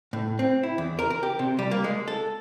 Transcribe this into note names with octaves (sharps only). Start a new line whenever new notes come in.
A2
C4
E4
E2
A#4
A#4
G4
C3
G3
A#3
G#3
A4